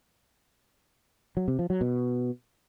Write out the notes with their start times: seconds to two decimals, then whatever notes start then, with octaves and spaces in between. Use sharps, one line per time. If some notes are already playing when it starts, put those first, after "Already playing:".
1.37 F#3
1.48 C3
1.59 F3
1.70 F#3
1.81 B2